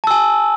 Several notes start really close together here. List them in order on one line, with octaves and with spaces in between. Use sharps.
A5 E6 G#5